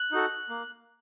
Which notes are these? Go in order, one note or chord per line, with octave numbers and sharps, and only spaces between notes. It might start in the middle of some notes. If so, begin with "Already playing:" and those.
Already playing: F#6
D#4 F#4 A4
A#3